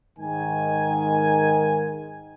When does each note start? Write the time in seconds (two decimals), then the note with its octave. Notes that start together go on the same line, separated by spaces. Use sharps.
0.19 G#2 D#3 G#5